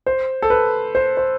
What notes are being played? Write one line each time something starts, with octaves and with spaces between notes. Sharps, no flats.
C5
A4
B4
C5
C5